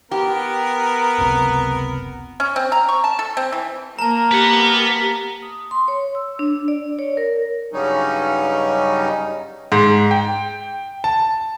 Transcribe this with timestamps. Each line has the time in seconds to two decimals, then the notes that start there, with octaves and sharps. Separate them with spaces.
0.11 B3 G4 A#4
1.18 F#1 C#2 C3
2.40 C#4
2.56 C4
2.72 A#5
2.89 C#6
3.04 A5
3.19 A4
3.37 C4
3.52 E3
3.99 A#3 A#4 A5 A#5
4.32 G4 B4 F#5
5.42 D#6
5.71 C6
5.88 C#5
6.15 E6
6.39 D4
6.68 D5
6.99 C#5
7.17 A#4
7.73 G2 C#3 F#3 G3 C#4 D#4
9.72 G#2
10.11 G5
11.04 A5